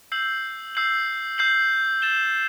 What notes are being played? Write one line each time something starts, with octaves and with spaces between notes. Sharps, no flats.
E6 G6 C7 F#7
E6 G6 C7 F#7
E6 G6 C7 F#7
A6 E7 G7